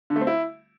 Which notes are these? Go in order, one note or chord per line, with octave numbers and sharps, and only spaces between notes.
D3
A3
C4
E4